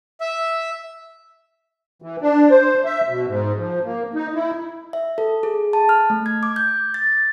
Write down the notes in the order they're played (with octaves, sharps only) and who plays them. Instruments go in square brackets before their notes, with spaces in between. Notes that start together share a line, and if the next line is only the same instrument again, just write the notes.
[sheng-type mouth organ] E5
[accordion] E3
D4
C5
E5
B2
G#2
F3
A#3
D#4
E4
[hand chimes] E5
A4
G#4
A5
F6
A3
G#6
D6
G6
A6